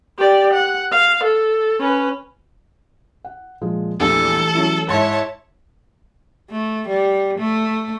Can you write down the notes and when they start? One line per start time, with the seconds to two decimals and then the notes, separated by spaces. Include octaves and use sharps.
0.18 G4 D5
0.53 F#5
0.92 F5
1.24 A4
1.80 C#4 B4
3.24 F#5
3.61 A#2 F3 G#3
4.00 A#1 E2 E3 G3 A3 D4 A4
4.55 F#3 C#4 E4
4.89 G#2 E4 C#5 A5 C6 A6
6.51 A3
6.88 G3
7.39 A3